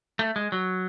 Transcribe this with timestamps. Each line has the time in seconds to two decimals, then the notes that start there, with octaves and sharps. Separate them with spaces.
0.19 A3
0.36 G#3
0.52 F#3